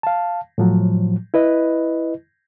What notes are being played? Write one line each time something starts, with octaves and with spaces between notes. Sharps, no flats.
F5 A5
A2 F3 F#3
E4 B4 D#5